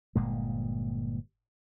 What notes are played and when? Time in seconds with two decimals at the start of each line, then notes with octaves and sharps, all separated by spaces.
0.15 G1 A#2 G#3